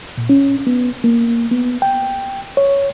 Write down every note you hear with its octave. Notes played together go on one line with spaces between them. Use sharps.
A#2
C#4
B3
A#3
B3
G5
C#5